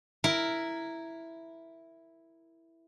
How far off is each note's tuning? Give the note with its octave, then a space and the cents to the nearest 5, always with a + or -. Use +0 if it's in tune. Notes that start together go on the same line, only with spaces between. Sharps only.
E4 +0 A#4 +0